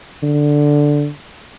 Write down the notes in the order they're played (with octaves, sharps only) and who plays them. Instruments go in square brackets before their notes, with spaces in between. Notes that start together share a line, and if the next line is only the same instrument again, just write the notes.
[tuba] D3